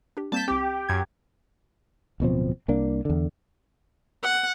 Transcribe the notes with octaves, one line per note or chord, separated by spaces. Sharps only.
D4 G4
G3 A#3 C4 A5 G6 B6
C2 C4 G4
F#2 G#6
D1 B2 F3 C4
C2 A#3 D4
E2 D3
F#5